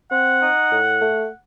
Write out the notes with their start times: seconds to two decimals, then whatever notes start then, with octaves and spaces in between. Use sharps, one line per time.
0.11 C4 F#5
0.41 D#4
0.71 A2
1.01 A3